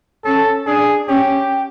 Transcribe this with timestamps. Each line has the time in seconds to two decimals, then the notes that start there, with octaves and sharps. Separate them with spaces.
0.24 C#4 A4
0.66 D4 G#4
1.08 C#4 G4